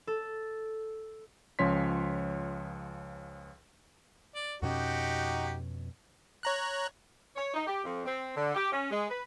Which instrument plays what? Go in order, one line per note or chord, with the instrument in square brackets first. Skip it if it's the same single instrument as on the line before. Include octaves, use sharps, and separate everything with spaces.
[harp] A4
[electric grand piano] C#2 F3 C#4 C#5 C6 B6
[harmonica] D5
[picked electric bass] F2 B2 C#4 [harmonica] D#4 F#4 G4
[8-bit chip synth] C#5 A#5 F#6
[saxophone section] C#5
D#4
G4
F2
C4
D3
G4
C#4
G#3
B4